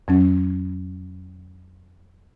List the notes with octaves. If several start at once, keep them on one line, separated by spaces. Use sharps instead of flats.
F2 F#3 C#4